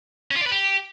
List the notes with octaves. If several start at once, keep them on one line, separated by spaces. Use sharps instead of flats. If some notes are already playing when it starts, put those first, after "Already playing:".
C#4
F4
D5
B4
G4